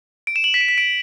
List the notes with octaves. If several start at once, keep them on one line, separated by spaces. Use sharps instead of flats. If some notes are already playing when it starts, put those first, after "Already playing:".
D7
E7
F#7
B6
D7
B6
D7